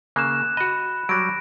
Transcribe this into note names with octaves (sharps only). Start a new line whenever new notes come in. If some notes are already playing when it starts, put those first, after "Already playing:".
C#3 A#3 F#6 E7
F#4 D#5 B5
F#3 G3 A#6 D7